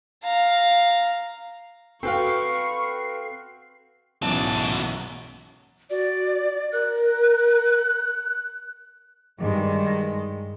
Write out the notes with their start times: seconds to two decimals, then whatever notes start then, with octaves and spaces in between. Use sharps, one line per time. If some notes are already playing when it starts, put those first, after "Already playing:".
0.24 F5 A#5
2.03 C4 F#4 A4 B4 F5 G5 C#6 C7
4.22 B1 F#2 E3 B3 F#4 G#4 D5 A5
5.90 F#4 D5
6.72 A#4 F#6
9.40 G2 D#3 G#3